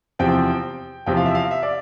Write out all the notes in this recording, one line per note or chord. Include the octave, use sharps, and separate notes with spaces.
E2 C3 F3 C4 G5
E2 C3 F3 C4 G5
F5
E5
F5
E5
D5